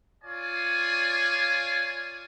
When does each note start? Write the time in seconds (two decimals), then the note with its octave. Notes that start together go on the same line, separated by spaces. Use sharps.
0.24 F4 C#5 D5 G#5